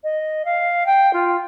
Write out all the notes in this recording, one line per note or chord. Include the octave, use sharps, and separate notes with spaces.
D#5
F5
G5
F4